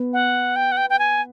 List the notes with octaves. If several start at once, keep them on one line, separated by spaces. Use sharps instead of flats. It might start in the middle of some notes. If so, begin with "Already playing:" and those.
Already playing: B3 B4
F#5
G5
F#5
G5
G5
G#5